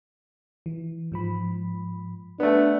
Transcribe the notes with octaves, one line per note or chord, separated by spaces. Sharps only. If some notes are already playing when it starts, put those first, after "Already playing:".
E3
G#2 F3 B5
A3 B3 D4